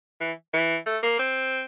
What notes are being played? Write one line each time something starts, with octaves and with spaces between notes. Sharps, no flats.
E3
E3
A3
A#3
C4